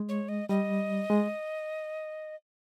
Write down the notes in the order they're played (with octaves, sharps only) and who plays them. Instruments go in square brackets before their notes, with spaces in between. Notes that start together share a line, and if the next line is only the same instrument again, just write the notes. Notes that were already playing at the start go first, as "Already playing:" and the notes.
Already playing: [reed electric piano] G#3
[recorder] C#5
D#5
[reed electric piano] G3 [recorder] D#5
[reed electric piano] G#3